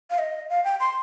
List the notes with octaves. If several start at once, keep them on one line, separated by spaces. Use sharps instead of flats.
F5
D#5
F5
G5
C6